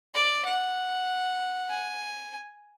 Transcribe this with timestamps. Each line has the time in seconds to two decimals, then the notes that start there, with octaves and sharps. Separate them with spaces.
0.15 D5
0.45 F#5
1.70 G#5